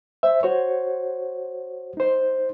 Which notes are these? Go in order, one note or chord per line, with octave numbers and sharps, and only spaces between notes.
C5 E5
F#4 C5 C#5
D#4 C5